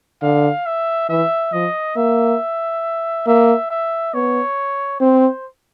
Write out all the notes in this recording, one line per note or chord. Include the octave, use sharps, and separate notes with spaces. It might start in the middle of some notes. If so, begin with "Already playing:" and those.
D3 F5
E5
E3 E5
F3 D#5
A#3 E5
A#3 E5
E5
B3 C#5
C4 C5